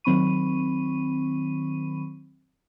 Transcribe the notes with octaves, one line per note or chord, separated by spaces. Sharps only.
D#3 F#3 C4 B5 C#6 D#7